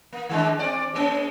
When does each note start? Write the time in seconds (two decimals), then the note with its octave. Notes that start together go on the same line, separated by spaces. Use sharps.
0.13 A#3
0.29 D#3 G#3 D4
0.59 C4 D5
0.94 G#3 A#3 C#4